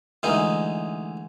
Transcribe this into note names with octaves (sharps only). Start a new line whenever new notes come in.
D2 E3 G#3 D#4